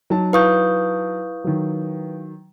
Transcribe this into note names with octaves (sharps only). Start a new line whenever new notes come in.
F#3 D#4 A5
E4 B4 F5 C#6 D#6 G6
D#3 F#3